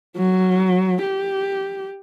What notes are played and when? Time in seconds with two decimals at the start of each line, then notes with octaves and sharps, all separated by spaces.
0.17 F#3
1.02 G4